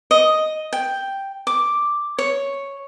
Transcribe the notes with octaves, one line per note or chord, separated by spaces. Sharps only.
D#5
G5
D6
C#5